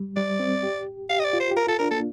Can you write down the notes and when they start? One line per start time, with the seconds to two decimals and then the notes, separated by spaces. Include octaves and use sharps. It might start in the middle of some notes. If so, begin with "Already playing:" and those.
Already playing: G3
0.16 G3 D5
0.40 C4
0.63 G4
1.10 G4 F5
1.19 D#5
1.24 D5
1.33 F4
1.40 C5
1.51 G4
1.57 F4 A#4
1.67 F4 A4
1.79 D4 A#4
1.91 A#3 A4